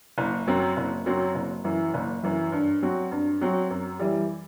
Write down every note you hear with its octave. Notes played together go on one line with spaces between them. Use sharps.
F#1
F#2 F#3 C4
F#1
F#2 F#3 C4
F#1
F#2 E3
F#1
F#2 E3
G2
F#3 C4 F#4
G2
F#3 C4 F#4
F#2
E3 G3